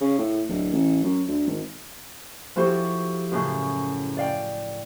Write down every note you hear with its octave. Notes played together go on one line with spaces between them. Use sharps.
C#3
A2
D1
A1
F#2
D2
G#1
F3 E4 F#4 G4 A4 C5
F#2 A2 C#3
D5 F5 G5